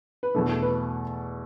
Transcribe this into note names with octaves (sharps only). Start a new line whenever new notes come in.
B4
E2 B2 A3 A4
B4